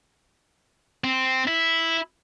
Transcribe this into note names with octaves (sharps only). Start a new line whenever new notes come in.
C4
E4